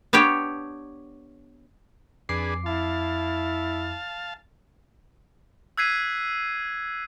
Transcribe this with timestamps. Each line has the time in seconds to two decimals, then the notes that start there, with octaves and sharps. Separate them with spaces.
0.13 B3 D4 G4 C#5 G5
2.29 F2 D4 G#4 B4 D6 C7
2.66 E4 F5 A5
5.77 E6 F#6 G#6 B6 C7 D#7